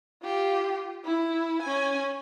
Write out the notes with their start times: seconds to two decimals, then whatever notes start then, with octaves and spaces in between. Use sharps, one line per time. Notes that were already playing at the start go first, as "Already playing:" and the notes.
0.23 F4 G4
1.05 E4
1.62 C#4 G#5